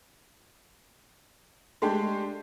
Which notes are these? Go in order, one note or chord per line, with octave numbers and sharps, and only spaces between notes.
G#3 A3 D4 G4